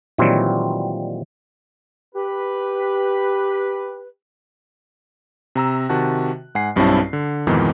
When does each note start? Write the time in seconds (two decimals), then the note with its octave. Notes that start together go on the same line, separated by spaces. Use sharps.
0.18 A#2 D#3 E3 F#3 G3 C4
2.15 G4 B4
5.56 C3 A#5 E6
5.89 C3 D#3 F#4 A5 F#6
6.55 G#2 F#5 G#5 C7
6.76 B1 G2 C4 C#4 E4 A5
7.13 D3
7.47 F2 G#2 B2 D#3 E3